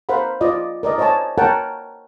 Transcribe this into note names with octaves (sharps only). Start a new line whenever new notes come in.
A#4 C5 F5 F#5 B5
F4 D5 D#5
A#4 D5 D#5
C5 C#5 D#5 G#5 A5
A#4 C#5 F#5 G5 A5